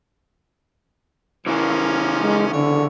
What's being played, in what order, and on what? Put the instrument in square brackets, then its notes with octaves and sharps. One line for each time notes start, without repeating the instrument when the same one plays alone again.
[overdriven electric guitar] C#3 E3 [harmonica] F3 A#3 C#4
[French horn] G#3
[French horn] D3 [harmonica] C#5